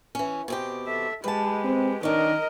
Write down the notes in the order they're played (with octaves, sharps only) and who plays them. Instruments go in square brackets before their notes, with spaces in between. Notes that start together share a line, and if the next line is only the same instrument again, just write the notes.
[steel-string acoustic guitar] E3 C#4
B2 C4 G4
[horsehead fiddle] A4 E5
[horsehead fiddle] G#3 G4 [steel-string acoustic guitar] B4 A5
[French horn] C4
[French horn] D#3 [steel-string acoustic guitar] C#4 D4 [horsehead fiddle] A#4 D#5